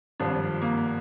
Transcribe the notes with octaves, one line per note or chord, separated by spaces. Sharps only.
G#1 G2 F3 D4
A#3